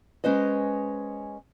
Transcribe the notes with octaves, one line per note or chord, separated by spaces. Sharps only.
G#3 C#4 B4 C5 D#5